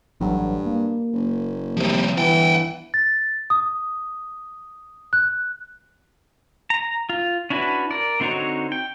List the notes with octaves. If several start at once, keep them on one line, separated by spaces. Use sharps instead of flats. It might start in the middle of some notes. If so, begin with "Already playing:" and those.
A1 G2 F#3
A#3
F#1
C3 F3 G3
G1 E3 F#5 G5
A6
D#6
F#6
A#5
F4
C#4 D4 E4 F#4 B4
A#4 D5
D3 C4 D#4 F#4 C#5
G5